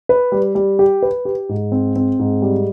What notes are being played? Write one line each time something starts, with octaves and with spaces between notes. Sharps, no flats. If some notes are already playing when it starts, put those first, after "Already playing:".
B4
G3
G3
G4
B4
G4
G#2
C4
C4
G#2
G3